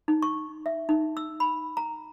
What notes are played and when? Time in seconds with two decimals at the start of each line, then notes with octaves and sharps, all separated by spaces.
0.08 D#4
0.22 C#6
0.66 E5
0.89 D#4
1.17 E6
1.40 B5
1.77 A#5